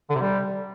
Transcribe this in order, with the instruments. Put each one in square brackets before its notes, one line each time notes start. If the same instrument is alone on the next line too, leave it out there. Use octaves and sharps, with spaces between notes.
[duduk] D3
C3
G3